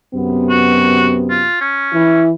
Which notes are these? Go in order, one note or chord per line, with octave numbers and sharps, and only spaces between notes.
F#2 C3 B3
F#4
F4
C#4
E3 E4